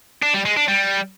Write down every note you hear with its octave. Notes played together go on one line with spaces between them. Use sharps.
D4
G3
G#3
D4
G3